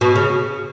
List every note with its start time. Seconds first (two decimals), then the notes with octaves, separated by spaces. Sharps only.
0.01 B2
0.16 C#3